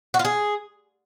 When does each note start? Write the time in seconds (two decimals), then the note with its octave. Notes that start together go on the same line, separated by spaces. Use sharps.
0.14 F#4
0.19 F4
0.25 G#4